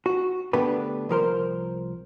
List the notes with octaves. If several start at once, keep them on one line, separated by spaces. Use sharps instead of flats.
F#4
D3 A3 B3 D4 G4 B4
C2 F3 A#4 C5